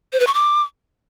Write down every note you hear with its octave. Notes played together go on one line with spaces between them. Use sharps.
C5
B4
C#6
D6